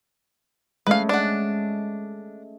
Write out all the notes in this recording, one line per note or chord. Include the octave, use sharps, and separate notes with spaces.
G#3 A3 C#4 B4 F5
D4 F#5